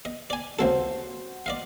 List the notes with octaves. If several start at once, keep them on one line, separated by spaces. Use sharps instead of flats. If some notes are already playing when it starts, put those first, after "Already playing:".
D#5
D5 G#5
C#2 C4 F#4 A4 C5
D5 D#5 F5